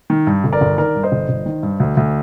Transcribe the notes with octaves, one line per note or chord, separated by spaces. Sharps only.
D#3
G2
G1
A#4 D5
G1
D#3 A#4 D5
G2
C5 D#5
G1
G1
D#3
G2
D2
D2